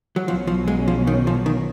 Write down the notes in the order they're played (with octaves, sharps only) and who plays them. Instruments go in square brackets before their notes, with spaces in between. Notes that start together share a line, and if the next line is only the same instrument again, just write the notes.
[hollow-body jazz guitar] F#3
[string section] B1 B2 F#3 C#4 [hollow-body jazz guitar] F3
[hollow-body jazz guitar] F3
G#3
F3
D#3
F3
D#3